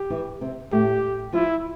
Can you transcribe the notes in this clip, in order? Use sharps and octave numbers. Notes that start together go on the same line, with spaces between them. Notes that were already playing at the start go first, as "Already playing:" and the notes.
Already playing: G4
E3 E4
C3 C4
A2 A3 G4
F3 E4 F4